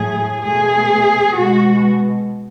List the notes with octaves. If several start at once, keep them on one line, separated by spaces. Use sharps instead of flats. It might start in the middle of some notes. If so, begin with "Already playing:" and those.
Already playing: A2 F#3 A3 G#4
B2 A3 G#4
B2 G#3 F#4